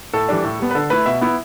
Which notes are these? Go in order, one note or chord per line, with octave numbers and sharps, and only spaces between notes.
A2 A4
E3 G3 D4
A2
G3 B3
B4
D3 A4
A3 E4 B4
B2 E5
B3 E4